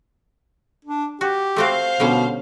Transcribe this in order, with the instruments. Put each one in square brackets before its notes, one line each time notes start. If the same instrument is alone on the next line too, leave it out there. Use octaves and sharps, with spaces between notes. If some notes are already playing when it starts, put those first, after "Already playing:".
[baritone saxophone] D4
[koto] F#4 [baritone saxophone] G4
[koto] A3 C4 F#4 [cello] C5 F5
[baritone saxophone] B2 [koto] D3 G3 C#4